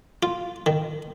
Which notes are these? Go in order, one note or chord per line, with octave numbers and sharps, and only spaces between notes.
F4
D#3